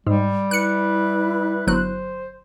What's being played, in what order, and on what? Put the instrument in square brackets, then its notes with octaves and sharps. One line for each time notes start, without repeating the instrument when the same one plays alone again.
[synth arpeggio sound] G#2 [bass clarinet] G3
[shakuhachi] E4 [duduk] B4 [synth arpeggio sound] F#6 C#7
[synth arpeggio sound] G1 F#3 F#6 [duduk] C5